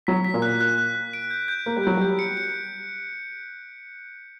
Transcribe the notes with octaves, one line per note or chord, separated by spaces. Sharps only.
F#3 B6
B6
A#2 A#3
F#6
F#6
F#6
F#6
D7
G6
G6
A#3 G6
G3
F#3 G6
G3 G6
C#7
C#7